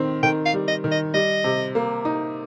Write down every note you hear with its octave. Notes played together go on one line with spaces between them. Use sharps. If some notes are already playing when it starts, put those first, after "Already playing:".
Already playing: D#3 C4
D#3 G5
F5
G3
D#5
D#3
D#5
G3 D#5
C3
A#3
D#4